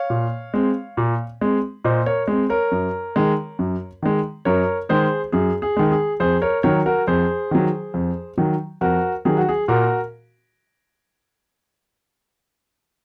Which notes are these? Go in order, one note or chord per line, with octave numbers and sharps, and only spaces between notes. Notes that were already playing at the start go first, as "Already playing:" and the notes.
Already playing: C#5 F5
A#2
G#3 C4
A#2
G#3 C4
A#2 C5 D#5
A#4 C#5
G#3 C4
A#4 C#5
F#2
D#3 G#3
F#2
D#3 G#3
F#2 A#4 C#5
D#3 G#3 G#4 C5
F#2 G#4
G#4
D#3 G#3
G#4
F2 G#4 C5
A#4 C#5
D#3 F#3 A#4 C#5
F#4 A#4
F2 G#4 C5
D#3 F#3
F2
D#3 F#3
F2 F#4 A#4
D#3 F#3 G#4
F#4
G#4
A#2 F#4 A#4